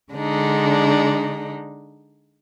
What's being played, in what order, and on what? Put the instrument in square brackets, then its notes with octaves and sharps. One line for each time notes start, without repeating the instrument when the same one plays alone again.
[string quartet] D3 G#3 D4 D#4